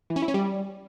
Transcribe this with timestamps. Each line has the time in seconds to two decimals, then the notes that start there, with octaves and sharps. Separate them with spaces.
0.10 E3
0.16 C#4
0.22 E4
0.28 C#4
0.34 G3